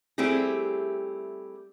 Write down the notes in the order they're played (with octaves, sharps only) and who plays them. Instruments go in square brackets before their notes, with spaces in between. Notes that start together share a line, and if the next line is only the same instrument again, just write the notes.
[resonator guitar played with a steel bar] G3 A3 C4 E4 G4 G#4